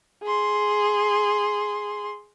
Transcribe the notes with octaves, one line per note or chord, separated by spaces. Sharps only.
G#4 C6